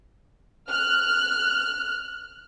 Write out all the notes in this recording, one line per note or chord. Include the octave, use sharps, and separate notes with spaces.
F6 F#6